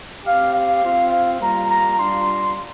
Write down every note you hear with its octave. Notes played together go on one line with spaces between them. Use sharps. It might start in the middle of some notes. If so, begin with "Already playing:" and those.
C4 G4 F5
F5
C4 F4
F5
G3 A#3 F4 A#5
A#5
G3 D4 F4 C6